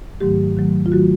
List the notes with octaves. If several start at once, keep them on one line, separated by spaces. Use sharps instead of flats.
G#2 D#3 F#3 A3 G4
G#2 D#3 F#3 A3
F4
D#3 F#3 A3 F#4